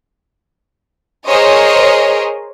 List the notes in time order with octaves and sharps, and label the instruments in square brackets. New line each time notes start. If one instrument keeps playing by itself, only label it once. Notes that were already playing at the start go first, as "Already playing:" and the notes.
[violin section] G#4 A#4 C5 C#5 D#5